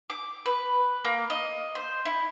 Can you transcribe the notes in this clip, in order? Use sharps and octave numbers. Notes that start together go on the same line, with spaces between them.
D6
B4
A#3
D#5
C5
E4